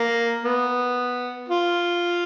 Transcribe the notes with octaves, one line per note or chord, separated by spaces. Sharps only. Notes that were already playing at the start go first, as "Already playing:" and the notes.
Already playing: A#3
B3
F4